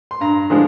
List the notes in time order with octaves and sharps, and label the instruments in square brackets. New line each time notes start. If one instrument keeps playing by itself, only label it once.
[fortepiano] C6
G2 A#5
D3 F3 G#3